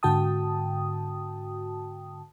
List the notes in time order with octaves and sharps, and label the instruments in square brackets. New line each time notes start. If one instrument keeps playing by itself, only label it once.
[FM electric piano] G#2 D3 F#4 G5 A5 D#6